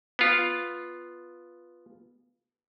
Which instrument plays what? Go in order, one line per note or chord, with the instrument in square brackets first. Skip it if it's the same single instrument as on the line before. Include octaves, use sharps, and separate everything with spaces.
[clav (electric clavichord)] B3 F4